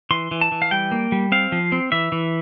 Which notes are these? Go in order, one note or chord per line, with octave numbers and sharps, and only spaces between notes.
E3 C6
E3
A5
E3
F5
G3 G5
A#3
G3
C4 F5
F3
C4
E3 E5
E3